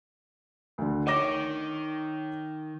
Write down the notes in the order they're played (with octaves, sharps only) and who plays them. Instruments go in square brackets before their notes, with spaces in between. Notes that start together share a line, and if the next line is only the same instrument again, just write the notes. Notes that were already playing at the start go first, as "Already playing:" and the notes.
[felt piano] D2 D3
[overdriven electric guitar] D#3 [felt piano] C#5 D6 A#6